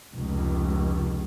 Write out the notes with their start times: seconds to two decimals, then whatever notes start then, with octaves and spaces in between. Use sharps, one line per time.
0.14 F1 C#2